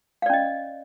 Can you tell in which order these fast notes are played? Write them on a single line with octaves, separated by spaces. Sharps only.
F5 D5 C#4 D#5